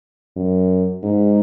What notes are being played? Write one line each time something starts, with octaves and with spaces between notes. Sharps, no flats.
F#2
G#2